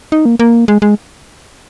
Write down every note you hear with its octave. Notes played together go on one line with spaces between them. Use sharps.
D#4
A#3
A#3
G#3
G#3